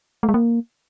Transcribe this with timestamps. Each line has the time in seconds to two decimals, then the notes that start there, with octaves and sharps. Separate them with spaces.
0.23 A3
0.29 G#3
0.34 A#3